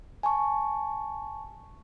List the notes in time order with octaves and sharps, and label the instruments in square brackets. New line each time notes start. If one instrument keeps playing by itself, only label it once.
[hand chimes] G#5 A5 C#6